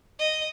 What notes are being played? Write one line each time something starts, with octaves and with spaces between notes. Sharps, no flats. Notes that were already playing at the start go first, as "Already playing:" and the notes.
D#5